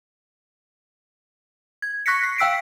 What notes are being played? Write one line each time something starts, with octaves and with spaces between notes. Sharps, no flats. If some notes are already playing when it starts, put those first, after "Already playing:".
G#6
C#6 F#6 A#6 B6 C#7
C7
F5 G5 E6 B6 D7